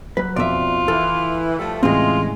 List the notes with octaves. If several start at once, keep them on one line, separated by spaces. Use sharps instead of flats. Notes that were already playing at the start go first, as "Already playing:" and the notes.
F#3 B4 F#6
B1 F2 F4 D5 E5
E3 A4 F6
F3 G3 A3
A2 C#3 E3 G3 G#3 C4 F4